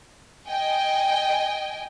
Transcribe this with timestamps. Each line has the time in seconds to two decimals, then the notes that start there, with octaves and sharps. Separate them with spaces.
0.47 D#5 G5 G#5